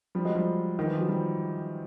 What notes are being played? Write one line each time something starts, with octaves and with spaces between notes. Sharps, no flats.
F3 G3
F#3 G#3
F3 G3
D#3
E3
F3
F#3
F3 G3